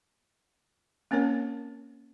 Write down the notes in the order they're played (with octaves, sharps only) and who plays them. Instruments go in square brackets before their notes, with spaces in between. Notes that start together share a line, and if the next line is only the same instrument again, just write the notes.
[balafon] A#3 C4 C#4 A#4 C#5